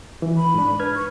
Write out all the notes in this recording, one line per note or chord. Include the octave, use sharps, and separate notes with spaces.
E3
B5
G#2 D4
B4 F6 G#6
C#6